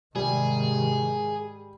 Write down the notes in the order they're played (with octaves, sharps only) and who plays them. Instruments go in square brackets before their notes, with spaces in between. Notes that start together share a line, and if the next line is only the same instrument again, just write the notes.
[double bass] G#2 D#3 [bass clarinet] C3 [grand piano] G3 [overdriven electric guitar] G#4